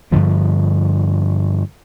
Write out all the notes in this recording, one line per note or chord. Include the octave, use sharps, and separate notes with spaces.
G2 D3 F3 A#3